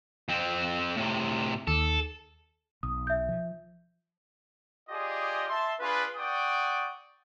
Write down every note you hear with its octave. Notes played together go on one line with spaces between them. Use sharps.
F2 C4
A2 C3
D#2 A4
B1 D#6
E5 G6
F3
F4 G4 G#4 D5 D#5
E5 A5 C6
D4 F4 G#4 B4
D5 F#5 G5 C#6 D#6